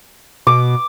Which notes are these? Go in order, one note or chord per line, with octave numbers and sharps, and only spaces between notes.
B2 D6